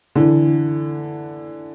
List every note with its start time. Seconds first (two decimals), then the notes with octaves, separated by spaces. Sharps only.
0.15 D3 E3